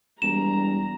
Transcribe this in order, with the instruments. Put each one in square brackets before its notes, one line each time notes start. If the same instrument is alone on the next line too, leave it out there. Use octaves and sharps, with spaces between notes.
[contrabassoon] E1 [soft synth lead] G3 [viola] A#5 [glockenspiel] E7